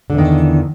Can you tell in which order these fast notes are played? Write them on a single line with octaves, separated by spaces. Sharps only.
D3 E2 D#3